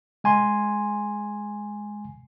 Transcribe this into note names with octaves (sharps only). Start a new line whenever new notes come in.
G#3 G#5 C6